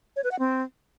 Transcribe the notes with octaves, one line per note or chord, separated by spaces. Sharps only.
C#5
B4
F#5
C4